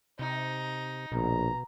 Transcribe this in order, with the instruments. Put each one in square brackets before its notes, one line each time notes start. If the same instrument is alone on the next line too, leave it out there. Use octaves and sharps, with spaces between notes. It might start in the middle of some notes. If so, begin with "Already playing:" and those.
[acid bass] C3 [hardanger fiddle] D#4
[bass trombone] A#1 [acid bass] B2 [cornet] A#5